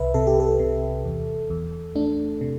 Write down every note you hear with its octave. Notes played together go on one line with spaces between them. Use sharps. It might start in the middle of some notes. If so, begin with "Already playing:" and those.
Already playing: C2 C3 B4 E5
C3 A4
G4
A4
C3
E2
E2
A3 D4
C3